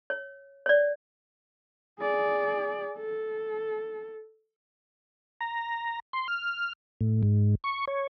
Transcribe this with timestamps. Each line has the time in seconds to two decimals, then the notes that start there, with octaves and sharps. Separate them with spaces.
0.10 C#5
0.66 C#5 D5
2.00 G#4 D5
2.98 A4
5.41 A#5
6.13 C6
6.28 F6
7.01 A2
7.23 G#2
7.64 C#6
7.88 C#5